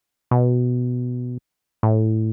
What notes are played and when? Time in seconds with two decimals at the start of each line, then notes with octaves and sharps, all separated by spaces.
0.31 B2
1.83 A2